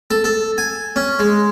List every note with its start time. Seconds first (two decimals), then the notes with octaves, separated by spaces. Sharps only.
0.11 A4
0.24 A4
0.58 G#5
0.96 C#4
1.19 G#3